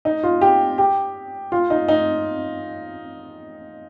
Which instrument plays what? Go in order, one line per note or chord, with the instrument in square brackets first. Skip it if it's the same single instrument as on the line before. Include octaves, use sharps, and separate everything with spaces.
[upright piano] D#4
F4
G4
G4
F4
D#4
D#4